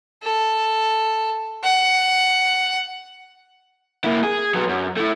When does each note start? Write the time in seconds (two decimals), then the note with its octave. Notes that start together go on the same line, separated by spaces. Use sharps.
0.23 A4
1.64 F#5
4.04 A#3 E4
4.23 G#4
4.54 F#3 B3
4.69 F#2
4.97 A3 E4